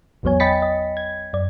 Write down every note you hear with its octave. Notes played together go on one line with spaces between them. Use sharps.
G#1 E2 F#3 B3 C#5 G#5
D#5 G5 B5 A6 B6 C#7
D#5
G#6
F#2 D5